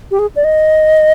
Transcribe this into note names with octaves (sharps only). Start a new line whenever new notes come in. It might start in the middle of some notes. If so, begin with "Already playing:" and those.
G4
G#4
D5
D#5